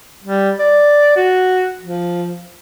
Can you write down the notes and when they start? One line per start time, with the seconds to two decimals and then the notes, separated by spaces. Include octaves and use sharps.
0.24 G3
0.59 D5
1.16 F#4
1.81 F3